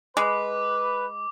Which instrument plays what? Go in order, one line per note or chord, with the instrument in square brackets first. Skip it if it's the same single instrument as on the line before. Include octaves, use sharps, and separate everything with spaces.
[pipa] G#3 [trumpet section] B4 [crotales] D6